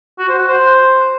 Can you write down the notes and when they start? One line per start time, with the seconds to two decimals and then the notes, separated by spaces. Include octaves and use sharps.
0.19 F#4
0.29 C5
0.38 F#5
0.48 C5